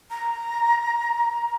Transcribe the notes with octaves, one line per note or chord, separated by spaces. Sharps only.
A#5